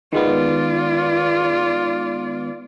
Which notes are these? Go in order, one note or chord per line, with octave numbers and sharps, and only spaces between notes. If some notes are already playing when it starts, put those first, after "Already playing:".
D#3 G#3 B3 F4 D5